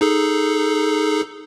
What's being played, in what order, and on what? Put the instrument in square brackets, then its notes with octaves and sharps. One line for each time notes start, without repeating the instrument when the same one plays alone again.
[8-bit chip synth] D#4 G#4 A4